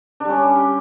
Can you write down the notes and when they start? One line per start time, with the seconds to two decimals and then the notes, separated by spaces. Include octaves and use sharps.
0.20 D3 G3 D4
0.30 C#4
0.56 G4